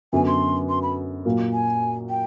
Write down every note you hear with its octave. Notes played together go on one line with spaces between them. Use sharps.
F#2 D3 F#3 B3 G#5
C6
C6
B5
A#2 F#3 A#3
G#5
G5